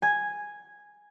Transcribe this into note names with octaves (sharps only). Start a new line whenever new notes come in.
G#5 G#6